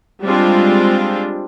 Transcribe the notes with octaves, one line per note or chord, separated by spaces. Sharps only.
G3 G#3 C4 D4 F4